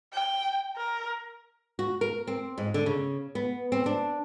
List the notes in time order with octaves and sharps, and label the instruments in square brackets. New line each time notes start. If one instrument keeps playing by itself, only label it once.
[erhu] G5
A#4
[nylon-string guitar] F#4
A#4
C4
G#2
D3
C#3
B3
C4
D4